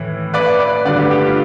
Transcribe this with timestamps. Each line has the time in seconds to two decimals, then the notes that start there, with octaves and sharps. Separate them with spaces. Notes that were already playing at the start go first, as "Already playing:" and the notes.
Already playing: A2 E3
0.34 B4 D5
0.59 B4 D5
0.85 G2 D3 B4 D5
0.99 G4 B4
1.11 G4
1.25 F4